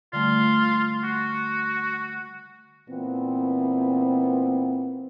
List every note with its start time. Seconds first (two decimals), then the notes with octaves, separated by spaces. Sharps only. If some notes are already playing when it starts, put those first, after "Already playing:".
0.13 D3 G3 A3 F4
1.04 F#4
2.89 A#2 E3 B3 C4